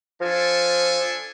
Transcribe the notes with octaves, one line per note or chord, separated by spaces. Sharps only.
F3 D4 A4 G#5